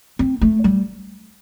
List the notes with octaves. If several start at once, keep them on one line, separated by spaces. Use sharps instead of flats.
C4
A3
G3